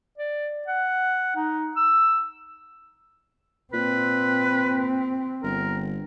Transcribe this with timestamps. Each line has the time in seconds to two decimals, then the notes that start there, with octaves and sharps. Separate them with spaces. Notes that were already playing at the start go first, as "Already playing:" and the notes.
0.18 D5
0.68 F#5
1.36 D#4
1.77 E6
3.73 A#2 C4 B4
5.43 G1 A#4